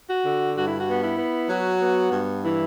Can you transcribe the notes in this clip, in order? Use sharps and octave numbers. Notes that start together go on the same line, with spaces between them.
F#4
D3
G2 F#4
E4
F#4
B3
E4
B3
F#3 F#4
B3
G2
E3 E4